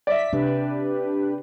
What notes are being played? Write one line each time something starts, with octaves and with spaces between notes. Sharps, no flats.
D5 E5 B6
C3 D4 G4 B4